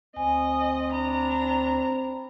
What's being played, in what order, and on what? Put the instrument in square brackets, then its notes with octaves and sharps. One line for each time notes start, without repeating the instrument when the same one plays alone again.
[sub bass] D2 [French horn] C4 [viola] D#5 [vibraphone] G#5
[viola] D4 A#5 [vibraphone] B5